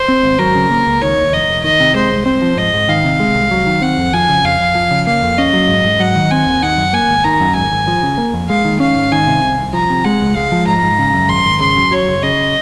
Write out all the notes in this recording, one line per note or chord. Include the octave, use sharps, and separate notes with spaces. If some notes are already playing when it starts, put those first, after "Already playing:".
Already playing: C5
C4
G#1
F#3 A#4
C#3
A#3
C#2
D#3 C#5
D#2
F1 D#5
F1
D#3 D#5
C3
G#3 C5
C2
C4 C5
F3
G#2 D#5
G#2
D#3 F5
C3
G#3
C2
F#3
D#3
C4 F#5
F2
F3 G#5
C#3
F2 F5
F2
F3
C#3
A#3 F5
F2
C#4 D#5
F#3
G#2
G#2
F#3 F#5
D#3
C4 G#5
D#2
D#3 F#5
F#2
A#3 G#5
G#1
D#3 A#5
F#2
G#1 G#5
G#1
F3
C#3
A#3
F2
G#3 F5
D#3
C#4 F5
G#2
D#3 G#5
C3
C2
C2
F3 A#5
C3
G#3 F#5
C#2
G#3 F5
F3
G#2 A#5
G#2
C#3
F#2
G#1 C6
G#1
C#3 C6
F#2
F#3 C#5
F#1
C#3 D#5